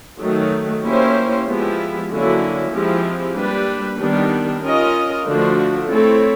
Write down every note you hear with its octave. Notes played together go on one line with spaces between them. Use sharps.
D#3 F#3 A3
A#3 C#4 E4 G4 C5
F3 G#3 B3 E4 G4
D3 F#3 A#3 C#4 E4
F3 G#3 C4 E4 G4
G3 A#3 D4 G4 B4
D#3 G3 B3 D4 G4
C#4 F4 A#4 D#5
D3 F3 A3 D4 F#4
A3 C4 E4 A4 C#5